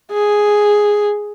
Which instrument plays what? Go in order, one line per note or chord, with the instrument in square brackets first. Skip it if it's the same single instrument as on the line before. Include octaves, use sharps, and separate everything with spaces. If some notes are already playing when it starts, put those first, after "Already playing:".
[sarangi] G#4